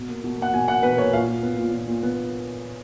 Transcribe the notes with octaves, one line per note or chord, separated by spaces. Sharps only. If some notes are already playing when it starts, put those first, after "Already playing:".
Already playing: B2
A#3
B2
A#3 F#5
B2 G#5
A#3 F#5
B2 B4
A#3 C#5
A#2 F5
A#2
B3
A#2
A#2
A#2
B3